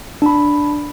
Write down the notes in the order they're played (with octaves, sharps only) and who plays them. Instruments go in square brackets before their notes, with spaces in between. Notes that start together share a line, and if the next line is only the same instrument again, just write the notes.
[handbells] D4 B5